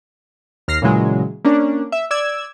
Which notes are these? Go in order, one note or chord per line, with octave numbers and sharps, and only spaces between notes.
D#2 F6 A#6 C7
A#2 C#3 E3 F#3 G#3
A#3 C#4 D4
E5
D5 E6 G#6